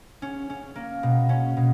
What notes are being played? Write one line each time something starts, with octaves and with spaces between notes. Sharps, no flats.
C#4
C#4
A#3
B2
C#4
B2